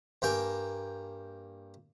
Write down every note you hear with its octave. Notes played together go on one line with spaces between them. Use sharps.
G2 A#3 G5 G#5